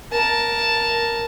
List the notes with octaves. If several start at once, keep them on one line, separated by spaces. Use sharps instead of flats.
A#4 A5